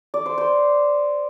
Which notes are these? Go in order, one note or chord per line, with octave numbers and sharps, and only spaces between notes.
D5
C5
C5